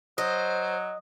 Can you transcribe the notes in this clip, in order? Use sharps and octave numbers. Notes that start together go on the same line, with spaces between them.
F#3 C5 D#5